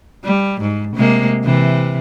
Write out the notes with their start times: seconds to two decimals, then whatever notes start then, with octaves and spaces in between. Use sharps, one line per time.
0.24 G3
0.61 G#2
0.96 C3 G#3 A#3
1.44 C3 E3